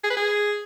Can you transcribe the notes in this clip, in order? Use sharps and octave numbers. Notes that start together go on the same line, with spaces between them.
G#4
B4
G#4